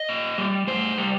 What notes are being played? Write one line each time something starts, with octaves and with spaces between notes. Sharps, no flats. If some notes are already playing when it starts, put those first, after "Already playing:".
Already playing: D#5
A#2
G3
A2 C5
G3